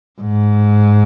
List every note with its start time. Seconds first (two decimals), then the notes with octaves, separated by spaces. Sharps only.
0.21 G#2